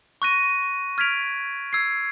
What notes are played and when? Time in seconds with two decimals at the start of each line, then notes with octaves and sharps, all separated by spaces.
0.22 C#6 F#6 A#6 D#7
0.98 F6 G#6 B6 D7 F7
1.73 E6 G#6 C7